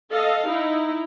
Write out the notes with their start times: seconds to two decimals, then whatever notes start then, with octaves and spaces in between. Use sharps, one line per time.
0.11 A4 D#5 F5
0.49 D#4 E4